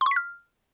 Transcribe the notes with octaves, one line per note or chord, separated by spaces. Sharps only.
C6
C#6
B6
F6